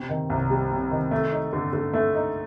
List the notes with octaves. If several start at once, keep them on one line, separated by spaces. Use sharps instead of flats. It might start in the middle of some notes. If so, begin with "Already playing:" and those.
Already playing: C3
D#3
C2
G3
C3
D#3
A3
D#4
D3
D3
A3
D#4